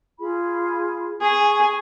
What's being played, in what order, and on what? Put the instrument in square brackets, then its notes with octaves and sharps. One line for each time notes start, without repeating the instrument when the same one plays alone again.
[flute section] F4 G#4 B5
[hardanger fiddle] G#4 [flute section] G#5 C#6